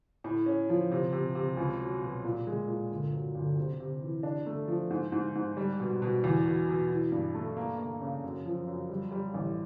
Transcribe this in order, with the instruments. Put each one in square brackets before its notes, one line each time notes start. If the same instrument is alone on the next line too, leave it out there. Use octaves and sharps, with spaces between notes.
[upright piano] A2
C#4
F3
C3
C3
C3
C#2
F#3
B2
A#2
G#3
A#2
G1
F#3
G1
C3
C3
E3
D4
A3
F3
G#2
G#2
G#2
G3
B2
B2
E2
B2
B2
E3
G2
A3
A#3
A#3
C#3
F#2
F3
F#2
G3
G3
A1